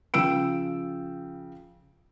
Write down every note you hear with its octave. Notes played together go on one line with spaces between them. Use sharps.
C#3 F3 G5 E6 D7